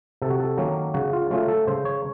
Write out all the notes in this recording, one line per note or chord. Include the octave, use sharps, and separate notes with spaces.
C3 A4
F#4
A4
D#3 F#3 A#3 C#4
C#3 F#4
F4
F#3 A3 C#4 F4
A4
C#3 C5
C#5